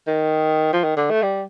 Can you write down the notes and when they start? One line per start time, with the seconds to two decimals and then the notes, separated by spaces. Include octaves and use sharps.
0.07 D#3
0.73 F3
0.84 D#3
0.97 D3
1.10 A3
1.22 G3